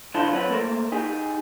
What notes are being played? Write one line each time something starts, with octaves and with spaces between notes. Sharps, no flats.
D3 E4 F4 C5 A5 C6
F#3 C4 B4 C#5 F#5
A3 A#3 A4 A#4 C5
D#4 G4 G#4